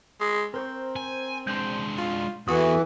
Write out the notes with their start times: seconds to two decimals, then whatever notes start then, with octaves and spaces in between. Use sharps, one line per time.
0.21 G#3
0.54 C4 A#4 C5 C#6
0.96 G#5
1.47 G#3 D4 C6 G6
1.98 F4
2.48 E2 E3 F#4 A4 D#6